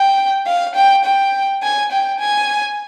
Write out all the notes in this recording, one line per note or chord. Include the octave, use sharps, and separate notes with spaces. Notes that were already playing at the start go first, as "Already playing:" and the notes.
Already playing: G5
F5
G5
G5
G#5
G5
G#5